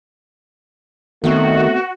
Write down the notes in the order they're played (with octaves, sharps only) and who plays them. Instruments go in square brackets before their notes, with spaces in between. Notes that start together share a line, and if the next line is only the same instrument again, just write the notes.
[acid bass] D#3 [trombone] A3 [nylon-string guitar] B3 C4 [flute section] F#4